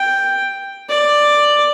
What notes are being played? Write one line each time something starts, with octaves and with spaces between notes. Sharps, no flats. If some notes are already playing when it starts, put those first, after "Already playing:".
Already playing: G5
D5